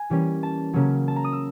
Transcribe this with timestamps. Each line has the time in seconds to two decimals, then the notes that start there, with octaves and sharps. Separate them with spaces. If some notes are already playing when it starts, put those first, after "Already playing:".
Already playing: G#5
0.10 E3 G3 A#3 C#4
0.43 A5
0.74 C#3 F#3 A#3 C#4
1.08 A5
1.16 A#5
1.24 D#6
1.33 E6